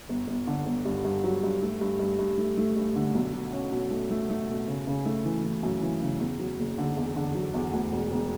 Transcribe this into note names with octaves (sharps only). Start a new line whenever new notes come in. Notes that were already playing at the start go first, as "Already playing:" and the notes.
G1
G1
D3
G1
G2
G2
F#3
G2
A3
G2
G2
G2
A3
A3
G2
D3
B1
B2
C#4
B2
A3
A3
A3
B2
C#3
C#3
A3
E3
E3
F#2
E3
C#3
E2
F#3
F#1
D3
E2
D3
F#3
E2
D2
E1
E1